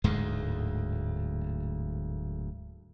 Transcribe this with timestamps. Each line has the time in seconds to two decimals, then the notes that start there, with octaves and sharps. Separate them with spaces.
0.04 D1 D2 G#2 G#3